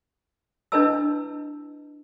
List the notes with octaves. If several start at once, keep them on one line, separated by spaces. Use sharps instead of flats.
D4 E4 B4 D#5 A5 E6